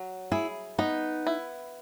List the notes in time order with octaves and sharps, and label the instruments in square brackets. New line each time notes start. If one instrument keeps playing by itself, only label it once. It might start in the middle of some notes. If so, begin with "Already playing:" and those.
Already playing: [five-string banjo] F#3
[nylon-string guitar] E4 [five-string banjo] G#4
[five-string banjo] B3 [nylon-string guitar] D#4
[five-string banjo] E4